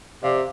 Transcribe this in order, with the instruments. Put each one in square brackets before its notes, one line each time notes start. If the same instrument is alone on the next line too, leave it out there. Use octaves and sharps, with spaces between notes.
[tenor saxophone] C3 [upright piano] D5 F5